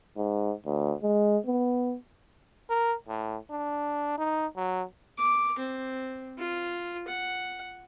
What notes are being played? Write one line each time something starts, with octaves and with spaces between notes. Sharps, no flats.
G#2
D2
G#3
B3
A#4
A2
D4
D#4
F#3
D6
C4
F4
F#5